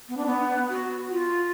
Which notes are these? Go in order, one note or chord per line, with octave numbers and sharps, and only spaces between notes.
B3
D4
B3
F#4
F4